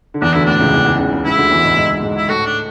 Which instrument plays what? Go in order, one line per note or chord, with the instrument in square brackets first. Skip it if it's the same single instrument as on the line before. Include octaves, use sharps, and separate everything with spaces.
[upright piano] D3
[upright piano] E2 E3 [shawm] D4
[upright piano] D2 D3 [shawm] E4
[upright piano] A2 [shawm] D4
[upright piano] C#2 C#3
E2 E3
E2 E3
C#2 C#3
C#2 C#3
[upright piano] C#2 C#3 [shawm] E4
[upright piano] D2 D3
E2 E3
G#2 G#3
G#2 G#3
G#2 G#3
[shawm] E4
[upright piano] A2 A3 [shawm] F#4
[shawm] D4